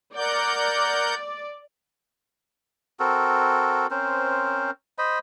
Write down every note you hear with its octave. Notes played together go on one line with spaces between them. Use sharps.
A#4 D5 F#5 G6
C4 F#4 A4 A#4
C4 C#4 A#4 C5
C5 D#5 B5